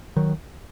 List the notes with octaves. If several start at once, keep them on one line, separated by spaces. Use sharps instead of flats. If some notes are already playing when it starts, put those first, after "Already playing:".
D#3 F#3